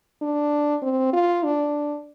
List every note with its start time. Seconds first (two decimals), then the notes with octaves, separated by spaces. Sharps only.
0.22 D4
0.82 C4
1.13 F4
1.44 D4